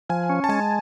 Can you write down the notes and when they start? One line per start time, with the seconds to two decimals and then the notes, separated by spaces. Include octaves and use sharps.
0.10 F3 G#5
0.30 C#4
0.44 A5
0.49 G#3 G#5